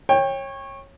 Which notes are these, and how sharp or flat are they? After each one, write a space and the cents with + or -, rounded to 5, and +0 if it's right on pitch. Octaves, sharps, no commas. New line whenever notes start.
C#5 -20 G5 +20